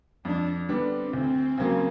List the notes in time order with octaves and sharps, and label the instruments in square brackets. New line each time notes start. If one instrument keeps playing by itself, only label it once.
[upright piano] F2 [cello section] D4
[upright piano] D3 G3 B3 D4
[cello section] C4
[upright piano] D2
C#3 F#3 A#3